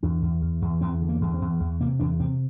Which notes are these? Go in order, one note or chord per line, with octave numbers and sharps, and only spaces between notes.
E2 D4
E2
E2
E2
E2 C4
D3
A#3
E2
C4
E2
E2
C3 A#3
E2 D4
C3 C4